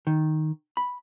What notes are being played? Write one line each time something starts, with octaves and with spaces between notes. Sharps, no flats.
D#3
B5